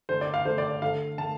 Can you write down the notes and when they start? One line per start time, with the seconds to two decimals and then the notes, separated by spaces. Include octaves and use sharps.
0.09 D3 A3 C5
0.21 D5
0.34 F5
0.45 D3 A3 C5
0.58 D5
0.70 D5
0.82 D3 A3 F5
1.18 D3 A3 A5